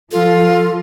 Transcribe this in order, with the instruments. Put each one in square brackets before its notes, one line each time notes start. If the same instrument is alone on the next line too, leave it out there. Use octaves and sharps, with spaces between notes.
[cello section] F3 [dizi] F4 [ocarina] A4